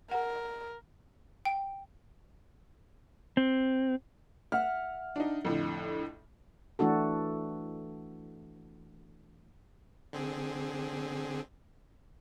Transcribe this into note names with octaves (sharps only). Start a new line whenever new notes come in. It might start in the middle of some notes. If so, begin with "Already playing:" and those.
A#4 F#5
G5
C4
E5 F#5 F6
D4 D#4
F2 A2 D3
E3 A3 D4 F#4 A4
D3 C4 G#4